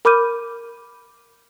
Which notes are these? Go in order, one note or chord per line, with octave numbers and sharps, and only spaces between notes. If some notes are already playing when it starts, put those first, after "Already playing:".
A#4 B5 D6 F6 G6 D#7